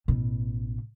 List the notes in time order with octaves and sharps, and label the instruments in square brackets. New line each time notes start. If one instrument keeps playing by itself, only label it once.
[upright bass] A1 B2